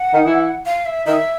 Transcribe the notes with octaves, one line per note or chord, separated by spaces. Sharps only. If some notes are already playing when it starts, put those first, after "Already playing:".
Already playing: F#5
D#3 D#4
E3 E4
F5
E5
D#3 D#4 E5